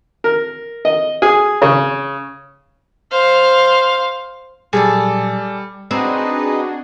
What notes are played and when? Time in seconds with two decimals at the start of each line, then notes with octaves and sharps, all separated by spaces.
0.24 A#4
0.85 D#5
1.22 G#4
1.62 C#3
3.11 C5 F5
4.73 A#2 F#3 G3 G#4 A4 D5
5.91 C4 D4 D#4 F#4 G#4 B4 D#5